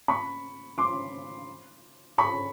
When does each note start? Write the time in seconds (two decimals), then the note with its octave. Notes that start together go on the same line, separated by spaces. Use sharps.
0.08 B5 C#6
0.78 C6 D6
2.18 B5 C#6